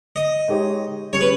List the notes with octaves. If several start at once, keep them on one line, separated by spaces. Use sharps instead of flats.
D#5
G#3 D#4 G4 C#5
G3 C#4 G#4 C#5
B4